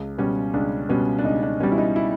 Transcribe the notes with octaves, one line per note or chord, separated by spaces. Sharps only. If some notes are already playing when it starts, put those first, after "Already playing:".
Already playing: C#2
B2 G3 C#4
C#2 D4
B2 G3 C#4
D4
C#2 D#4
D4
B2 G3 C#4
E4
D#4
E4